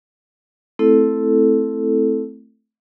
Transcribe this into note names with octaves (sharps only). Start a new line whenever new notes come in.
A3 C4 E4 A4